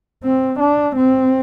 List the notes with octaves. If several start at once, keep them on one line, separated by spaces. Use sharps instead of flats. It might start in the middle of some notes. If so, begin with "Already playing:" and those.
C4
D4
C4